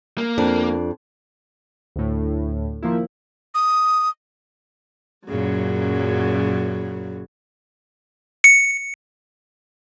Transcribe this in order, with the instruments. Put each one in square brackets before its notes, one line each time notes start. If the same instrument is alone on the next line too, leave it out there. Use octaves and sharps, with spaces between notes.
[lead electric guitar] A#3
[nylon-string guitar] F2 D4
[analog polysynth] D2 A2
D#3 F3 A#3 E4
[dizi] D#6
[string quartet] F#2 A#2 C#3 F#3
[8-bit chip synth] C#7